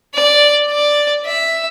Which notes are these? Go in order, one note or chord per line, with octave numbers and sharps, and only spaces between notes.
D5
D5
E5